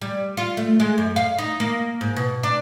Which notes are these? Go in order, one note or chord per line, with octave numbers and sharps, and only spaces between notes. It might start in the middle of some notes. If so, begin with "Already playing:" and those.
G3
F4
A3
G#3
F#2
F5
D#4
A#3
G#2
B2
D4